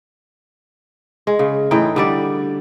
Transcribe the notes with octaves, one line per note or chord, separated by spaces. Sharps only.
G#3
C#3
A2 E3 D#4 G5
D3 G3 D5